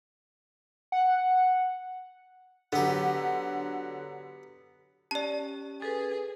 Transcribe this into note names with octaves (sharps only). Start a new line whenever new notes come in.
F#5
D3 F#3 B3 G4
C#4 G4 D5 A5
G#4 A4 B4